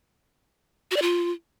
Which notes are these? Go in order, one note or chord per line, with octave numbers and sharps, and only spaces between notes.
F#4
D5
F4